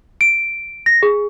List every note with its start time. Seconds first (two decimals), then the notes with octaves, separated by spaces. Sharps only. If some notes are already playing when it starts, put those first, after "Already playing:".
0.21 D7
0.86 A#6
1.03 G#4